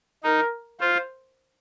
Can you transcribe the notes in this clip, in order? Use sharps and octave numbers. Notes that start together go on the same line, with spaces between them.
D#4 A#4
F4 C5